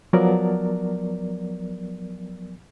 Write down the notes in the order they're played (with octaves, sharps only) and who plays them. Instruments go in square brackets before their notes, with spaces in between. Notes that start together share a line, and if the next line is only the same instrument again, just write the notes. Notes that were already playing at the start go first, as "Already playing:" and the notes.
[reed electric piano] F3 F#3 B3 A#4 D5